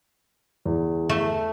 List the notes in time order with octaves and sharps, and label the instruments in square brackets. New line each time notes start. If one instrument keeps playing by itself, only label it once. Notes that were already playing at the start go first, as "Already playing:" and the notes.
[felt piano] E2
[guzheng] A3